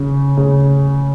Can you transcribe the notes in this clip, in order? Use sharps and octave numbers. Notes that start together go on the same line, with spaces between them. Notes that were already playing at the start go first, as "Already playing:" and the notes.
Already playing: C#3
C#3